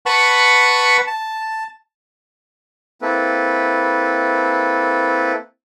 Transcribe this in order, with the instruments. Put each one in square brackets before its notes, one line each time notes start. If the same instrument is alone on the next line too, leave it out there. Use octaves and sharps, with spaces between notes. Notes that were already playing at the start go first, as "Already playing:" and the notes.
[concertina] B4 F#5 A5 B5 C#6 F#6
A5
[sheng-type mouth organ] A#3 C4 E4 A4 B4